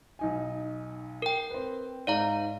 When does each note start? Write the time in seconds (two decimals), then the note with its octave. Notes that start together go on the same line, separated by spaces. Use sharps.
0.19 B1 D#4 G#5
1.22 A#4 G5
1.50 C4 B4
2.07 G#2 D5 F5 A#5